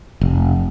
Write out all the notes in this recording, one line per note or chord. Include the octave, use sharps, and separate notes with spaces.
F1